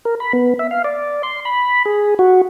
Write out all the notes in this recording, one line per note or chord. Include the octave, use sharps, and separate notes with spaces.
A#4
B5
B3
E5
F5
D5
C6
B5
G#4
F#4